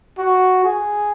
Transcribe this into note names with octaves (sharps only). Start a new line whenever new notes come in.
F#4
G#4